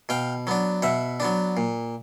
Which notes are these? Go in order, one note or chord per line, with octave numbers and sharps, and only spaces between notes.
B2 F5 G5
F#3 B3 D4
B2 E5 F#5
F#3 B3 D4
A#2